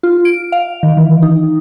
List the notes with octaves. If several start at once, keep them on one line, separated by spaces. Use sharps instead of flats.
F4
D7
F5
D#3
E3
D#4